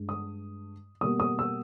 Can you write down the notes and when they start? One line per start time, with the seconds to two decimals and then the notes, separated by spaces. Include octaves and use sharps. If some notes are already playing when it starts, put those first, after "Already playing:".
Already playing: G2 G#3
0.09 D#6
1.01 B2 G3 A#3 D#6
1.20 D#6
1.39 E6